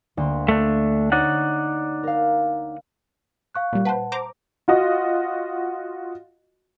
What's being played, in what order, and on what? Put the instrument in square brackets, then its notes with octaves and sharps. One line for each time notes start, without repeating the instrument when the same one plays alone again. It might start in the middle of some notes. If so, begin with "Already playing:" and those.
[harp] D2 A#3 C6
[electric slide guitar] A3 D4
[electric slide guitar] D#4 D5 F#5 [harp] C#5
[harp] A#4 F5
[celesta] F5 C#6 F#6
[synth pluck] A#2 G3
[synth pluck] B4 C5 [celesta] F#5 A5
[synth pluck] C5 A#5 D6
[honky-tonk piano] F4 F#4 D#5